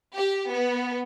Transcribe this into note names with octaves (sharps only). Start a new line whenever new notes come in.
G4
B3